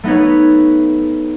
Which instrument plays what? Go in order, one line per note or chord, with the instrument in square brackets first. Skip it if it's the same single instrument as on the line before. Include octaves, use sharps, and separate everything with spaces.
[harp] A3 B3 D#4 B4 C#5